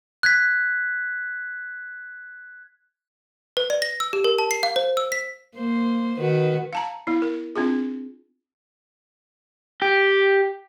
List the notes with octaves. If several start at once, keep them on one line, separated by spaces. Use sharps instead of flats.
F#6 G#6 B6
B4
D5
A#6
E6
G4
A#4
A5
C7
F5
C5
E6
B6
A#3 C5
D#3 F#4 B4
F5 A5 A#5
B3 E4
A#4
C4 D4 F4 G#4
G4